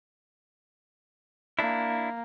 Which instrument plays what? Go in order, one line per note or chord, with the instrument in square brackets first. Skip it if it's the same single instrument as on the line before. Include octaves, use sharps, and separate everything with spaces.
[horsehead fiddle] A#3 [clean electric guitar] D4 E4